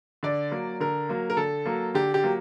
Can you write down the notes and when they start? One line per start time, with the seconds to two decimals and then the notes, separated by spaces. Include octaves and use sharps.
0.23 D3 D5
0.51 F#3 A#3
0.80 D3 A#4
1.09 F#3 A#3
1.30 A#4
1.37 D3 A4
1.66 F#3 A#3
1.95 D3 G4
2.14 G4
2.24 F#3 A#3